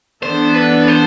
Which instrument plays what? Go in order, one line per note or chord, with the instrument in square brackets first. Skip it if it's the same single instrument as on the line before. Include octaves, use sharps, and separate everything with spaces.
[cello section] E3 B3 D4 A4 [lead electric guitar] C5
[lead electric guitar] B4
C5